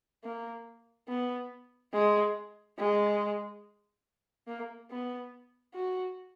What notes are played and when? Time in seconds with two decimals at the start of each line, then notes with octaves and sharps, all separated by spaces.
0.24 A#3
1.09 B3
1.93 G#3
2.78 G#3
4.47 A#3
4.90 B3
5.74 F#4